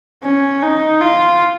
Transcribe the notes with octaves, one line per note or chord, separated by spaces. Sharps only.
C#4
D#4
F4